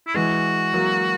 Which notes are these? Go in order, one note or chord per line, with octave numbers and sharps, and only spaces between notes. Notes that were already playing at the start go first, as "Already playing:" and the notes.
E4
E3 G#3 F#4
F#3 A#3